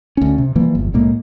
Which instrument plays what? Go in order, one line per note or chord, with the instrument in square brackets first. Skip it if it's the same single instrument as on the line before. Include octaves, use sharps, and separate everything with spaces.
[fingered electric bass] D2 C#4
C3
E3 F3 G3 A#3
G1 E2
C2 A2 G#3 A#3